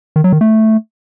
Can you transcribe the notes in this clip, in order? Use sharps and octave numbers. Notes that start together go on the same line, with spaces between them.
D#3
F#3
D#3
A3